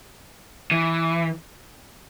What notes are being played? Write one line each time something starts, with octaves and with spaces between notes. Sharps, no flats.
E3